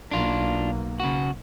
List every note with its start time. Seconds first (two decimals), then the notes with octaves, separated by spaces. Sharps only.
0.11 B1 A#3 D4 F4
1.00 C#3 F#4